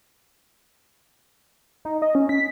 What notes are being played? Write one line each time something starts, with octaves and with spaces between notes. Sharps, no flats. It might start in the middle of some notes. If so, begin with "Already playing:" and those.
D#4
D#5
C#4
B6